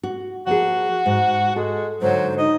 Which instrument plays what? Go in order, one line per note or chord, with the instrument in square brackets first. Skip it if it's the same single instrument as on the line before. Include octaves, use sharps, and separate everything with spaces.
[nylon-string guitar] F#4
[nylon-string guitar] F3 A#3 G#4 [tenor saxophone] F#4
[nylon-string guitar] G#2
[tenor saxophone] G#3 [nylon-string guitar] A4
[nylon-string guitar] G#2 D3 [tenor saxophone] F#3 [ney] C5
[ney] D#4 [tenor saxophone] D#5